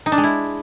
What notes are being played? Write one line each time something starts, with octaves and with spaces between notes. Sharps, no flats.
D#4
D4
G#3
E4